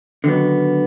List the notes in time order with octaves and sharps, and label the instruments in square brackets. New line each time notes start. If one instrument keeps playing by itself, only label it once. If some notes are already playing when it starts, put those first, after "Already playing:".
[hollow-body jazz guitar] D3 D#3 F#3 B3